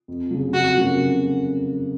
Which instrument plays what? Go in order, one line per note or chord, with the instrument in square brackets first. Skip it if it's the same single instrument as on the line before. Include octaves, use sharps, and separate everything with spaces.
[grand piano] F2
C#3 F#3
[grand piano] F2 [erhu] F#4
[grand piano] C#3 F#3 A#3 C#4